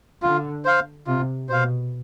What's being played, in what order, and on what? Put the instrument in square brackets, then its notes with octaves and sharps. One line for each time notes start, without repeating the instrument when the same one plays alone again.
[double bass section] D3 [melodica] F4
[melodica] C5 F5
[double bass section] C3 [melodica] F4
[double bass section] B2 [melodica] C5 F5